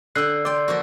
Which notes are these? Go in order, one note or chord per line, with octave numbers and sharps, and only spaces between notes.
D3 G5 E6 F#6 C7
D5 G5 C6
F3 A#3 F#4